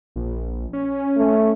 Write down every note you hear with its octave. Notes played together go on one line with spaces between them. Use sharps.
A#1
C#4
A3